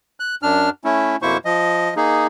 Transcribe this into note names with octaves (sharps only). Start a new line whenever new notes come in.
F#6
F#2 D4 F6
A3 C#4 E4
F2 B2 A#3 E4 C5 C#6
F3 D#5
A#3 D#4 G#4